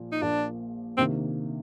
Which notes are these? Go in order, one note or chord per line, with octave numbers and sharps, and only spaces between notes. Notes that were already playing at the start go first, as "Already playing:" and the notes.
Already playing: A#1 A#2 F3 A#3
D#4
A#1 A#2 F3 A#3 D4
C3 D#3 A#3 C4 D4